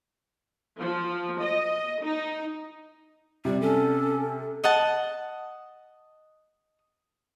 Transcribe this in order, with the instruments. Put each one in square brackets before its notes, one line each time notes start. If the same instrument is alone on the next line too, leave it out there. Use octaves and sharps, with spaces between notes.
[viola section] F3
D#5
D#4
[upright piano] C3 [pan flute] G3
[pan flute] C#4 [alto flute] A4
[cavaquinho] D#5 F#5 A5